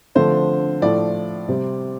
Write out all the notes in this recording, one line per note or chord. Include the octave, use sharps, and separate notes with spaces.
D3 F3 A3 C4 C5
A2 F3 A3 D5
C3 G3 C4